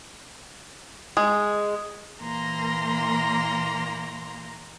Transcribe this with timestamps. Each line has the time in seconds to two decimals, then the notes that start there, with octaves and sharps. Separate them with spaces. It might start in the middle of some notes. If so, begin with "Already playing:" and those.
1.17 G#3
2.19 A#2 E3 A#3 A#5 C6